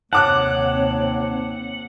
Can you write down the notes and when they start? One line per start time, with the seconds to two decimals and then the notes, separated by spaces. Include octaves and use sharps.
0.13 D#2 C3 C4 C#5 F#5 A5 D6 F#6